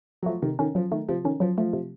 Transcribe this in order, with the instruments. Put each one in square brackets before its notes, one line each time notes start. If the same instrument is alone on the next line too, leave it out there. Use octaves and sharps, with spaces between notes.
[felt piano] F#3
[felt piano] F3 [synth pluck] A3
[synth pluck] C3 [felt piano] D#3
[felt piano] D#3 [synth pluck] C#4
[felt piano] F3 [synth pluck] F#3
[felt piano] D#3 [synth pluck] A3
[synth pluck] C3 [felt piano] F3
[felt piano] D#3 [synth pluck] C#4
[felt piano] F3 [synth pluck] F#3
[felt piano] F3 [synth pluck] A3
[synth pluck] C3